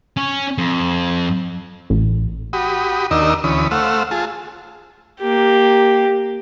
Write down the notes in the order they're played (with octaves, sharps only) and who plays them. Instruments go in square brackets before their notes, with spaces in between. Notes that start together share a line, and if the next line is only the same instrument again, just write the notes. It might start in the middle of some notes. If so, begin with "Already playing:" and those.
[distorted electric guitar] C#4
F2
[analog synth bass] A1
[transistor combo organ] F#4 G4 B5 D#6
D#2 D4 D#4 A#4 D#5 E6
D2 E3 C#4 B5 D#6
A3 C5 F5 F#5 E6
F4 G#4 A5
[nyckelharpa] A#3 G4